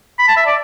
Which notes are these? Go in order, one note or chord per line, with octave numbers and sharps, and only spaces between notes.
B5
A5
E5
D5